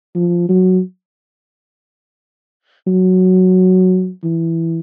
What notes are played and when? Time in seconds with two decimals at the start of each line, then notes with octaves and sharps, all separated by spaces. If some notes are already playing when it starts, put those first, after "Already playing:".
0.15 F3
0.49 F#3
2.87 F#3
4.24 E3